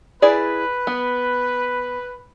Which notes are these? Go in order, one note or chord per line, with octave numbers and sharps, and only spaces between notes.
E4 G#4 B4 D5
B3